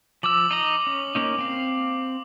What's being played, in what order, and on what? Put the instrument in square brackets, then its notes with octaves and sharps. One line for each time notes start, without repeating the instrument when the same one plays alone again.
[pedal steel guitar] F3 E6 [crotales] D6 F#7
[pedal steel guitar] D#4 D#5 A#5
C#4
A#3 C#4 D#4
C4 F5